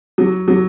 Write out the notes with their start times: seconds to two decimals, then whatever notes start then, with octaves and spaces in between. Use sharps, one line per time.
0.18 F#3
0.48 F#3